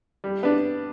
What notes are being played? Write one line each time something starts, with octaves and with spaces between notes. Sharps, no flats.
G3
B3 D4